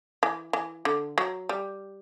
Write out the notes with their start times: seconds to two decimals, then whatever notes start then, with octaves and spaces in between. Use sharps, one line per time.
0.23 E3
0.53 E3
0.85 D3
1.18 F#3
1.49 G3